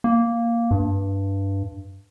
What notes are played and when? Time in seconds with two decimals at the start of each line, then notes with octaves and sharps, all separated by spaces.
0.04 A#3
0.71 G2